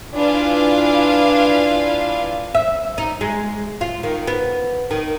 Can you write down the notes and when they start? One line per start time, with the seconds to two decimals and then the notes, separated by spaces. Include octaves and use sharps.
0.15 D4 E4 F4 B4 F5 G#5
2.55 E5
2.98 D#4
3.21 G#3
3.81 F4
4.03 D#3
4.27 B3
4.91 D#3